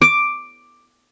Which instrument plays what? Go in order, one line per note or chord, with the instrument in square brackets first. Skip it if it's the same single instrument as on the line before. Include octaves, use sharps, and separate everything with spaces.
[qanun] D6